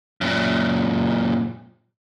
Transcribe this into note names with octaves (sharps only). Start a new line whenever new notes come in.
F#2 A#2